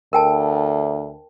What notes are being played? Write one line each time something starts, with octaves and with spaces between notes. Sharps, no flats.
D2 A#4 G5 A5